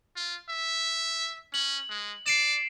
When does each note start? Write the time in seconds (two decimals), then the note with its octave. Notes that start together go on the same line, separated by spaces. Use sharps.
0.16 F4
0.50 E5
1.54 C#4 F#7
1.90 G#3
2.26 D5 C7 D7 E7